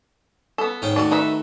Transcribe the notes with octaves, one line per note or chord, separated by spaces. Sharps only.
B3 A4
G#2 C#4 G5
D#3 A3 F#4 D5
D#4 B4 E5